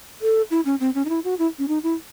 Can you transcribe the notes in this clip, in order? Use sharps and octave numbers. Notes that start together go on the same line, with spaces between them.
A4
E4
C#4
C4
C#4
D#4
E4
F#4
E4
C#4
D#4
E4